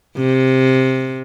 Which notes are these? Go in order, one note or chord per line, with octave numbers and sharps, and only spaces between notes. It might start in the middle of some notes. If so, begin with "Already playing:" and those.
C3